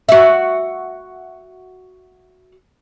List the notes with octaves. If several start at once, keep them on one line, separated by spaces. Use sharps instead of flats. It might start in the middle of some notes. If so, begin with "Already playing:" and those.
F#4 E5